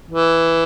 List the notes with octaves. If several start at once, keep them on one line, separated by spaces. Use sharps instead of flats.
E3